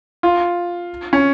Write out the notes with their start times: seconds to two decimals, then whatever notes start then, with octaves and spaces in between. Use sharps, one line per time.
0.23 F4
1.13 C#4